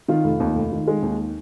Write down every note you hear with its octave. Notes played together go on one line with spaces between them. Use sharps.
D#3 F4
F1
D#2
F1
D#3
G#3
D#2